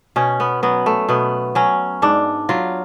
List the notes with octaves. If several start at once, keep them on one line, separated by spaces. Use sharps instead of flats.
B2 C#4
B3
F#3 B3
A3
B2 B3
F#3 C#4
G#2 D4
F#3 F4